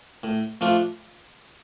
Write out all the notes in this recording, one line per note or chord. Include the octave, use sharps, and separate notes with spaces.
A2
F3 A3 D4 F4